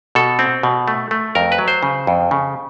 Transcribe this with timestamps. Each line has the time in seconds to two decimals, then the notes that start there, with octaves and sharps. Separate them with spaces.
0.15 B2 A4
0.39 C4
0.63 B2
0.88 A3
1.11 A3
1.35 F2 A#4
1.52 B4
1.59 F#3
1.68 C5
1.83 C#3
2.07 F2
2.31 C#3